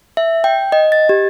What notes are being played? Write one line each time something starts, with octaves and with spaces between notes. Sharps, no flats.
E5
G5
D#5
A6
G4